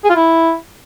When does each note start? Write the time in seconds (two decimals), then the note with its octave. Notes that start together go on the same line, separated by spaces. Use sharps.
0.04 G#4
0.10 F4
0.16 E4